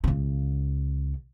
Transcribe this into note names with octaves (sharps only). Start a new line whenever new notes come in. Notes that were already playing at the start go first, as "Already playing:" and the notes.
C#2 C#3